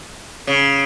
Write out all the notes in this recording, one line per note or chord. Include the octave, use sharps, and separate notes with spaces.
C#3